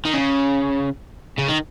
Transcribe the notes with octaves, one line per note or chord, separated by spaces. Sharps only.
D#3
C#3
C#3
D#3